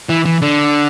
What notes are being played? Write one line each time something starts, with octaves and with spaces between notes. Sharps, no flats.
E3
E3
D3